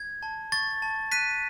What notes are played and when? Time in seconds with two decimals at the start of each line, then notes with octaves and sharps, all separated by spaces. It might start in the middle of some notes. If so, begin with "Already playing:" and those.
Already playing: G#6
0.23 A5
0.52 C#6 A6
0.82 A5
1.12 F#6 B6 D#7